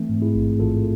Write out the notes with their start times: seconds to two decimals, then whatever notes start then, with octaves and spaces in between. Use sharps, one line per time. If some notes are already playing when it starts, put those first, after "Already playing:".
Already playing: E3 A3 C4
0.09 G#2
0.22 E4 G#4
0.35 A1
0.60 A1 F4 A4